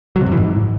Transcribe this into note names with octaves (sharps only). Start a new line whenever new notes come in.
F#3
C3
F#2
E3
G#2